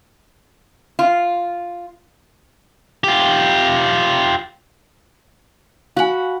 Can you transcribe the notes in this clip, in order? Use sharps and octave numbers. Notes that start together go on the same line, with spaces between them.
F4
F4 G4
F#4 F5 G#5 B5